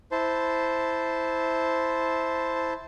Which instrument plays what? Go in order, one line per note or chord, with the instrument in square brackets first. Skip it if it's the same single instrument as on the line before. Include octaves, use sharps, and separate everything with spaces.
[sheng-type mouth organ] E4 C5 A5